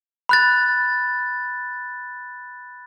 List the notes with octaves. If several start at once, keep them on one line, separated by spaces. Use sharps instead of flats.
B5 F#6 A6